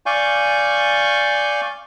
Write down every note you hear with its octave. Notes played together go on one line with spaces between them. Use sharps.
D5 F5 G#5 C#6 G6